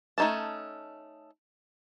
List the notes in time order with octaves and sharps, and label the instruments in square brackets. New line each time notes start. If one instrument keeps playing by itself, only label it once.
[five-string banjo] A3 C#4 D#4 A4 A5